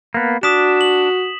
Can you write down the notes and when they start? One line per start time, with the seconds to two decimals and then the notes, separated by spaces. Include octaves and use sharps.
0.14 A#3 B3
0.43 D4 F#4 D#6 B6 E7
0.81 F#7